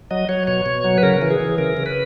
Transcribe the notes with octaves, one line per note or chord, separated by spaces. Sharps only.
F#3 D#5
F#3 C#5
B2 C#5
B2
F#3
B4
C#3 A#4
E3
G#4
E3
C#3 A#4
C#3
B4